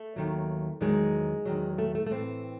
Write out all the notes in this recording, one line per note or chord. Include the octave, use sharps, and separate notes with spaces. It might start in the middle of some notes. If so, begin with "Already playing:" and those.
Already playing: A3
D#2 D#3 F#3
E2 D#3 F#3 G#3
E2 D#3 F#3
A3
A3
A3
A2 E3 C4